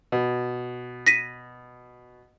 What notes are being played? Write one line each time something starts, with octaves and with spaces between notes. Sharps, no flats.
B2
A#6 B6 D#7